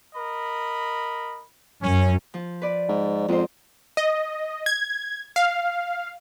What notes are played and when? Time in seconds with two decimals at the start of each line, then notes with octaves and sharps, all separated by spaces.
0.15 A#4 D#5 B5
1.82 F#2 C#4
2.34 F3
2.62 B4 D5
2.89 G#2
3.28 F2 G#2 C4 C5
3.97 D#5
4.66 G#6
5.36 F5